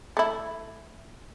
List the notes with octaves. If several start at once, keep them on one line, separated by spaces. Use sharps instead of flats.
A3 E4